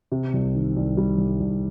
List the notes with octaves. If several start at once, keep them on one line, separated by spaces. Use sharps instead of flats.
C3
C2
D#3
C2
G3
C2
C2